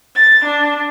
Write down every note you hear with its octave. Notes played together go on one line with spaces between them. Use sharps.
A6
D4